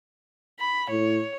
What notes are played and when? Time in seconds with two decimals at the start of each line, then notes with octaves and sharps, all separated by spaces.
0.60 B5
0.90 A2 C#5